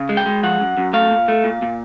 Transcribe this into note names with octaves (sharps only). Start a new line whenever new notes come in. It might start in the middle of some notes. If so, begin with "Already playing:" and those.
Already playing: C#3
G#3
G5
G#3
F3 F#5
F#2
F#2
A3 F5
A#2
A3
A#2
A#2